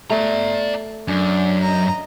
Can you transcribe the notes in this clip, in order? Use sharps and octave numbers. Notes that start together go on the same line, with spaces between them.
A3 D5 A#5
F#2 D4
D#5 A#5